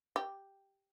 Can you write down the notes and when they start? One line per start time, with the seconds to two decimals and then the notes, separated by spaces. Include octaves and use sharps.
0.16 G4